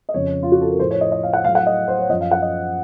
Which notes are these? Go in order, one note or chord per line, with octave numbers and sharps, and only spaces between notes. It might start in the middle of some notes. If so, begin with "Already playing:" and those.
D#5
F2 C#3 F3 C#5
F4
F#4
A4
A#4
A2 F3 C5
C#5
D#5
D#5
F5
F#5
A2 F#3 F5
F#5
D#5
C5
C#5
F#2 F3 D#5
F5
F#5
D#5